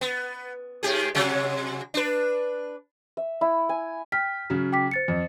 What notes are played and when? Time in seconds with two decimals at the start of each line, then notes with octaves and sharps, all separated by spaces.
0.01 B3
0.83 G#2 G4 G#4
1.15 C3 F#3 G#3
1.94 D4 B4
3.17 E5
3.41 E4
3.69 G#5
4.12 G5 F6 B6
4.50 C#3 F#3
4.73 G5 D6 B6
4.91 C5 A6 C#7
5.08 F2